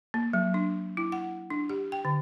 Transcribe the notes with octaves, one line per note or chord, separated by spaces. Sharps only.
A#3
F#3
D4
E4
F#5
D4
G4
G5
D3